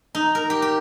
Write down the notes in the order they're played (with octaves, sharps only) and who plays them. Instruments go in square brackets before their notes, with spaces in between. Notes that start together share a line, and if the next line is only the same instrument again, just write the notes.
[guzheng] D#4
A#4
G4
G4